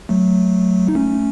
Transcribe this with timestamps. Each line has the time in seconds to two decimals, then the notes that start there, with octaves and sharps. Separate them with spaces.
0.09 F#3 A3
0.88 D#4
0.95 A3 C#4